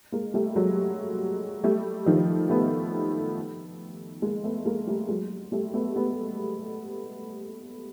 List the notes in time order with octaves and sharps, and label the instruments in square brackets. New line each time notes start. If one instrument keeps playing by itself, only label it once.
[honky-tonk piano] G#3 A#3
G3 A3
F#3 G#3
G3 A3
D#3 F3
A3 B3
G#3 A#3
A3 B3
G#3 A#3
G3 A3
F#3 G#3
G3 A3
A3 B3
A3 B3